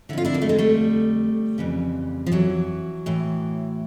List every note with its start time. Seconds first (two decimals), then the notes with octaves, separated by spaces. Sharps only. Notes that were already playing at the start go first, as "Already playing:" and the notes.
0.09 D3 E4
0.13 F2 F4
0.25 D4 E4
0.34 A#3
0.42 A3
0.49 G#3 A#3
0.59 G3 A3
1.58 F2 C#3 E3
2.26 F3
2.32 E3 F#3
3.06 A2 E3